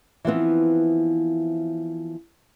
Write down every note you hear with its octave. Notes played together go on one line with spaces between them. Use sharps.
E3 F3 B3 C4